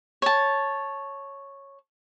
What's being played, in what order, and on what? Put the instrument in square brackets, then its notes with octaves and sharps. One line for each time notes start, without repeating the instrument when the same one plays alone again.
[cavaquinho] C#5 A5